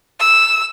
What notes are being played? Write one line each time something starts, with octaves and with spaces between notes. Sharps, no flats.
E6